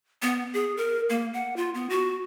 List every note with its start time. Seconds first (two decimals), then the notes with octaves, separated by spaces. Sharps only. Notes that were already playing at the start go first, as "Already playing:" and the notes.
0.22 B3
0.53 G#4
0.77 A#4
1.10 A#3
1.34 F#5
1.56 F4
1.75 B3
1.90 F#4